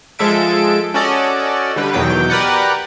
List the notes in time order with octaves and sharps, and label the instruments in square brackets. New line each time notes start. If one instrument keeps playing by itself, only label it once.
[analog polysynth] F3 G#3 A4 E5 D7
C#4 F#4 A4 D5 D#5
D3 G3 B4
E2 B2 D#3 F#3 G5 D6
G4 A#4 B4 D5 F#5